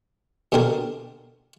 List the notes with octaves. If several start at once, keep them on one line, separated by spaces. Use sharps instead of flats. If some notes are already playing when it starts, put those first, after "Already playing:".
B2 D3 C4 G4 A4 A#4